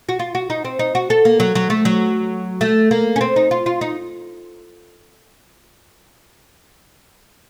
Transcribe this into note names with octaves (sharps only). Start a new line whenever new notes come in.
F#4
F4
F#4
D#4
C4
D#4
F#4
A4
A#3
F#3
F#3
A3
F#3
A3
A#3
C#4
C4
D#4
F4
F4
D#4